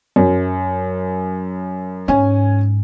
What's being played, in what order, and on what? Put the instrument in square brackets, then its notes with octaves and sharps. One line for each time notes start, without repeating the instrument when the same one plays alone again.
[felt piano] F#2
[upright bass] G#2 [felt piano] C#4 G#5